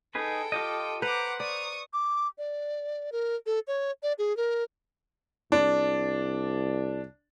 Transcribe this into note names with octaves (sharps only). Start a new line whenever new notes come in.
D#4 G#4 A4 B4 G5
F4 G4 D#5
B4 C5 F#5 A#5 D6
D5 C#6 D#6
D6
D5
A#4
A4
C#5
D5
G#4
A#4
C2 D4